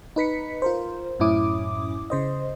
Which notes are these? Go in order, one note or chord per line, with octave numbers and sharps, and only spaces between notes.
D#4 B4 B6 C#7
F4 A#4 C5
F#2 A2 C#4 E4 D6 D#6
C#3 C5 D#5